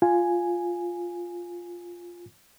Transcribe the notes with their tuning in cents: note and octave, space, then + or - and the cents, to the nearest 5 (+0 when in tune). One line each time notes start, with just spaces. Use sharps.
F4 +0 G#5 +0